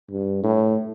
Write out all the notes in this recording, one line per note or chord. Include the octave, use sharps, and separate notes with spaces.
G2
A2